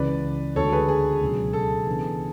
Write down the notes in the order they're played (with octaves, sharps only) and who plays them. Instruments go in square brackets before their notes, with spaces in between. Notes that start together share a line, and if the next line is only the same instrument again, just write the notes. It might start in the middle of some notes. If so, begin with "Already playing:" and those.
Already playing: [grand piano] C#2 C#3 E3 [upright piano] B4 D5
[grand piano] D2 C#3 G#3 D4 F#4 [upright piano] A4 C#5
[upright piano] G#4 B4
G#4
[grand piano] C#2 B2 F#3
[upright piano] A4
[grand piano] C#3 E3 B3 D4 G#4